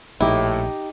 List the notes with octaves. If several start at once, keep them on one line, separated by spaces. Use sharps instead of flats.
A#1 A2 D#4 E4 G4